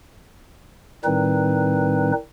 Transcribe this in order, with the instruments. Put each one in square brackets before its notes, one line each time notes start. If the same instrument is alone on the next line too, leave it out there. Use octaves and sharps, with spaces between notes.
[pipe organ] A2 D#3 G3 C4 D#4 B4